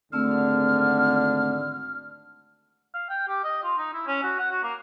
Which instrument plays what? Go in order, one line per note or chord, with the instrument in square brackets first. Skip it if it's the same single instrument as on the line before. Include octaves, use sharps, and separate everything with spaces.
[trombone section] G#1 D3 [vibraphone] A3 C4 E6 [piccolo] F6
[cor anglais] F5
G5
G4
D#5
F4
D#4
E4
C#4
F#4
F#5
F#4
A#3